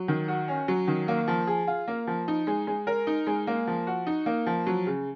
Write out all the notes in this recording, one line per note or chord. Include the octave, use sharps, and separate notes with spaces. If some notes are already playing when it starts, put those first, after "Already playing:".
Already playing: F#3
D#3
F#4
C#4
F#3
D#3
A#3
F3
G#4
F4
A#3
F3
D#4
G#3
G#3
A#4
D#4
G#3
A#3
F3
F#4
D#4
A#3
F3
F#3
C#3